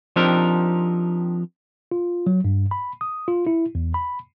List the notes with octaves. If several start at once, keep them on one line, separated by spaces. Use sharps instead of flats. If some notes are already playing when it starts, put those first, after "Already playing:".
F3 C4 D4 D#4 G4 A#4
F4
F#3
G2
B5
D#6
F4
E4
E2
B5